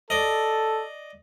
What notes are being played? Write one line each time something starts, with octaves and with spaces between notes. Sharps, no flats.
A4 D5 D#5